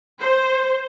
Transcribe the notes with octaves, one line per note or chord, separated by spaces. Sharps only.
C5